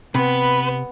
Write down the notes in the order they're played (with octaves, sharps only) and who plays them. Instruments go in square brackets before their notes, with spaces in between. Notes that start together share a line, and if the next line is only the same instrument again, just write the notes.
[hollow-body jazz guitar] C3 [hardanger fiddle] B3 [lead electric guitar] B4